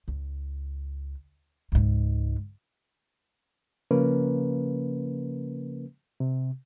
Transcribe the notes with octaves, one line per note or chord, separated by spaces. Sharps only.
C#2
C#2 G#2
C#3 F3 A#3 C#4 A#4 B4
C3